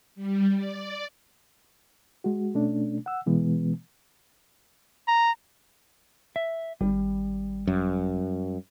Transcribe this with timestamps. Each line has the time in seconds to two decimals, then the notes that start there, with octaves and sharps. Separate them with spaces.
0.15 G3
0.54 D5
2.24 G#3 F#4
2.54 B2 A3 C#4 D4
3.06 F#5 E6
3.27 B2 E3 G#3 B3
5.08 A#5
6.36 E5
6.81 G#1 G3
7.67 F#2